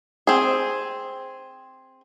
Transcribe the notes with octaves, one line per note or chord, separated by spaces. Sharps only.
C4 G#4